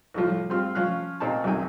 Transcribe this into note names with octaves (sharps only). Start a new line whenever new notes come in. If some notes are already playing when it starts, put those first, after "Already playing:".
C2 A2 F3
G2 C4 F4 C6 F6
F3 C#4 F5 F#6
A#2 C4 D#4 C#5 A5
B1 F#2 C3 D#3 G5 G#5